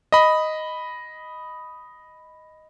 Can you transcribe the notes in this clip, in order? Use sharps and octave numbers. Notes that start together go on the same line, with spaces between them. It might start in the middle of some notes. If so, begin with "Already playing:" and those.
D#5 B5